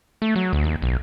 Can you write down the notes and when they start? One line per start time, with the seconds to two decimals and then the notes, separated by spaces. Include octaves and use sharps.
0.22 A3
0.36 F#3
0.53 D2
0.64 D#2
0.82 B1